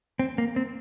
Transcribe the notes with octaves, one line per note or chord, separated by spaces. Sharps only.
C4
A#3
C4